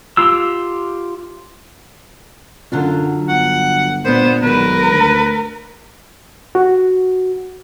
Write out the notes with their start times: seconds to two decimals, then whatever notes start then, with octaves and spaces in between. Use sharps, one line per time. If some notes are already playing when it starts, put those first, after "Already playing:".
0.17 F4 G4 E6
2.72 F#2 D3 F#3 F4
3.29 G1 F#5
4.05 A#2 A#3 B3 D4 C5
4.43 B1 D#3 G#3 A#4 B4
4.91 D2
6.55 F#4